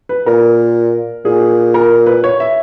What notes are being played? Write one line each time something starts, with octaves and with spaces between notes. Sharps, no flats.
B4
A#2 A#4
A#2 G#4
A#4
B4
C#5
E5